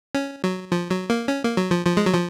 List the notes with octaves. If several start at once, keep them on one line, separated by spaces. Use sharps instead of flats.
C#4
F#3
F3
F#3
A#3
C#4
A#3
F#3
F3
F3
G#3
F#3
F3